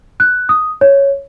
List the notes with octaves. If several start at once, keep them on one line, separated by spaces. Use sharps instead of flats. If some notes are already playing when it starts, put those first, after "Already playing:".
F#6
D#6
C#5